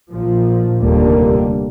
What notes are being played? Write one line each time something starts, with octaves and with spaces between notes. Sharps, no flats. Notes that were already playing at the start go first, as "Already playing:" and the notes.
A#1 A#2 F3
F1 D#2 D3 G3 A#3